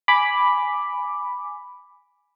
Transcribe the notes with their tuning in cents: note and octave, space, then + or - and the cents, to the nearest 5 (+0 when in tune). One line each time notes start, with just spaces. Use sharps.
G#5 +0 B5 +0 D6 +0